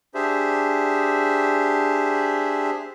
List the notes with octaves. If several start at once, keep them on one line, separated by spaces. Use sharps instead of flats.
D4 G4 G#4 C5 E5